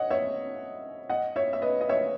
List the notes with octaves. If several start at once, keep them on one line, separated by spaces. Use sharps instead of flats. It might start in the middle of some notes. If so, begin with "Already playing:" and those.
Already playing: C#5 D#5 F#5
C#5 E5
D#5 F#5
C#5 E5
E5
B4 D#5
D#5
C#5 E5